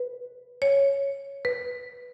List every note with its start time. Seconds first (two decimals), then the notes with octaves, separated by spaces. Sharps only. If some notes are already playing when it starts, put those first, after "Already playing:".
Already playing: B4
0.62 C#5
1.45 B4